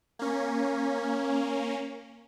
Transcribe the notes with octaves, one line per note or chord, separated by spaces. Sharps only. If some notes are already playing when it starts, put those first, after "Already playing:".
A#3 C#4